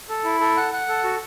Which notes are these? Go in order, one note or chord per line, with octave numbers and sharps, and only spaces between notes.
A4
E4
A4
F#5
F#5
A4
F#4